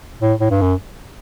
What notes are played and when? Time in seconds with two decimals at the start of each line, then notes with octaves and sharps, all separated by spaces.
0.21 A2
0.40 A2
0.50 G2
0.61 F#2